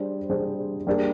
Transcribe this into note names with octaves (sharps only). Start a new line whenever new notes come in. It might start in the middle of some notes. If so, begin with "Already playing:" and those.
Already playing: G3 D4 G#4 C5
G3 D4 G#4 C5
G3 A#3 D4 G#4